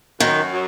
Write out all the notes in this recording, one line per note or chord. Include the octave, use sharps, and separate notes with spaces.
F#2 D#3
F#3